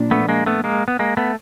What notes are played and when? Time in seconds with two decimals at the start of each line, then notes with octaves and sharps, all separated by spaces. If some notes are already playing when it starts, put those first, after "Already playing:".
Already playing: A#2 F3 A#3 D4
0.11 A3 B3
0.29 G#3 A#3
0.46 A3 B3
0.64 G#3 A#3
0.88 B3
0.99 G#3 A#3
1.17 A3 B3